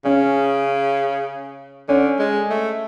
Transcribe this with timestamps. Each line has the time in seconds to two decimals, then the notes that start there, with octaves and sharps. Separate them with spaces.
0.05 C#3 C#4
1.88 D3 C#4
2.19 G#3
2.50 A3